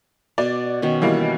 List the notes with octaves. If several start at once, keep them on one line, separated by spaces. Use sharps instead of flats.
B2 D5
B2 D#3 C#4
E3 G3 A#3